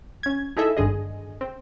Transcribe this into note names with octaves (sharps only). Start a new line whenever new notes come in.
C#4 G#6
D#4 E4 G#4 A4 D#5 E5
G#1 G2 D3 G#4 D#5
C4